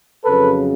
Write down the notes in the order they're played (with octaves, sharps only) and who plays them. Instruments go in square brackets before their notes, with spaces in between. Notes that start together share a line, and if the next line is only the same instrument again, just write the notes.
[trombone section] F2 C#3 F#3 A4 B4